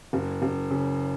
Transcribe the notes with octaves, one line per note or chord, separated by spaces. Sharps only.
F#1
F#1
C#3